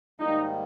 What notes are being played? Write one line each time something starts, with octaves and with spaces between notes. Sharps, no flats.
G#2 D#3 G3 A#3 D#4